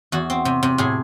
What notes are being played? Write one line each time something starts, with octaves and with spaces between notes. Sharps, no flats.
E2 F#4
C4
C3
C3
A2 G#4